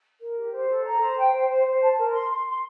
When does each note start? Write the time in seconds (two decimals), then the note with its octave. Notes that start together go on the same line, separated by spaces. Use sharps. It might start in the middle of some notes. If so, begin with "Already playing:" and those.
0.21 A#4
0.37 G4
0.52 C5
0.68 A4
0.84 A#5
1.01 C5
1.16 G5
1.33 C5
1.49 C5
1.66 C5
1.82 A5
1.98 A#4
2.13 C6
2.29 C6
2.46 C6